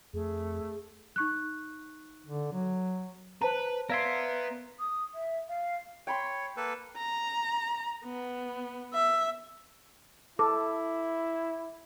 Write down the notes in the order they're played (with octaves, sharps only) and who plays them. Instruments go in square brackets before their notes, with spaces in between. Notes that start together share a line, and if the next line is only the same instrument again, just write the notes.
[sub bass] F2 [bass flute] A3 [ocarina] G#4
[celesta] D#4 C#6 F#6
[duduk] D3
F#3
[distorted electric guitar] B4 [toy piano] C5 A5 A#5
[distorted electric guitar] B3 [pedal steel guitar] A#4 E5 C6 [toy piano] D5 [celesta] F5 G#6 D7
[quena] D#6
E5
F5
[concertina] C#5 [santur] G5 B5 C6
[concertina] A#3 A4 B4
[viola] A#5
B3
E5
[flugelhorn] E4 [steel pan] A4 [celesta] D6